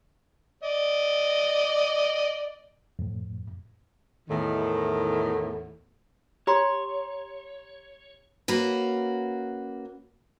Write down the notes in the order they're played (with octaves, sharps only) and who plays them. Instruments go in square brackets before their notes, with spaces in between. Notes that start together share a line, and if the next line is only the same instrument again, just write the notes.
[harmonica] D5 D#5
[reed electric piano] F2 A2
[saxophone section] E2 A2 D#3
[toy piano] G4 A#5 C6 [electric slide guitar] C#5
[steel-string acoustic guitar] A#3 C#4 F#4 B4